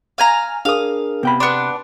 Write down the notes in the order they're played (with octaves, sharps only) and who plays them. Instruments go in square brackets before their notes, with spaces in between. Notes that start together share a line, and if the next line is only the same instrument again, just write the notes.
[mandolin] F5 G#5 A#5
[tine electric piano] D4 G#4 A#4 [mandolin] F5 D#6
[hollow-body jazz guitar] C3 G5 B5 [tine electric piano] B3
[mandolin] B3 D4 [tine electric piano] C6 F#6